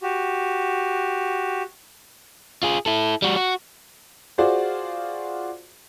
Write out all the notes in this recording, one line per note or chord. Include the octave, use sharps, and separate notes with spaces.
F#4 G4
F4 G#4
E4 A4
G3 F#4
F#4
F4 F#4 G#4 C5 D5